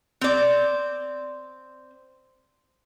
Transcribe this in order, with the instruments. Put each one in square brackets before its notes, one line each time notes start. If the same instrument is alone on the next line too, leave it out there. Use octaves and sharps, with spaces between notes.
[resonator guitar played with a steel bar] C4 D5